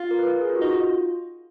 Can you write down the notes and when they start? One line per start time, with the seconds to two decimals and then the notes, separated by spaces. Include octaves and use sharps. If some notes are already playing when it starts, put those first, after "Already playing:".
Already playing: F4
0.11 A#4
0.19 B4
0.26 A#4
0.41 G#4
0.49 F4
0.56 F#4
0.61 D#4
0.70 F4